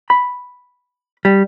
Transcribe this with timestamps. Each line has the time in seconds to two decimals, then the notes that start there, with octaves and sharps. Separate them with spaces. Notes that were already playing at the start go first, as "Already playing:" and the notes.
0.10 B5
1.25 G3